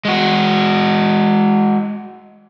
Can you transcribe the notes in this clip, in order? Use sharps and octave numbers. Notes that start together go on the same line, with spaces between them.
G#3 F#4